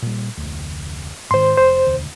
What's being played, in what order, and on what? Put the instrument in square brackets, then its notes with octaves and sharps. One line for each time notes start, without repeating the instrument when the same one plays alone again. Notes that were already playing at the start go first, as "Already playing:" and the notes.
[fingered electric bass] A#2 G3
F1 D2
[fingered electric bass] G#2 D3 D#3 [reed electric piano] C5 C6
[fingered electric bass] F1 [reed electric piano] C5
[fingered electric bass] E1 D2